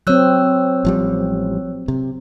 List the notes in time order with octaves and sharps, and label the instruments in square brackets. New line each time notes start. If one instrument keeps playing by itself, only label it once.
[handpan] F#3 C4 [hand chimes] C#5 E6 F#6
[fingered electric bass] A1 F3 G3
C3